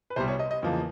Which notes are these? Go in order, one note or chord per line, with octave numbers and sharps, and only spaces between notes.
B4
C2 B2 G3 C5
C#5
D#5
D#5
E2 C#3 F3 A#3